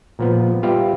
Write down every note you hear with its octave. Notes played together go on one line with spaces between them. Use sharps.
A#2 F3 B3
G3 F4 G4 B4 E5 F5